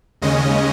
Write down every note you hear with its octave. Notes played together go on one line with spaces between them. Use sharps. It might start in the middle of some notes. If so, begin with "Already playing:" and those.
D#2 C#3 G#3 C#4 D#5